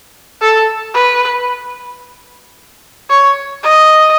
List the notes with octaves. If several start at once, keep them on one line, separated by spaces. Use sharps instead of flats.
A4
B4
C#5
D#5